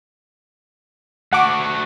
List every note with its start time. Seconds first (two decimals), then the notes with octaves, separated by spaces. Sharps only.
1.33 A3 F#4 F#5 D6